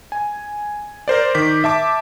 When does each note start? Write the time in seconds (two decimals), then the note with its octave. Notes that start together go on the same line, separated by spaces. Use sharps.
0.12 G#5
1.08 A#4 C5 D5
1.35 D#3 D6 G6 B6
1.64 E5 A5 D6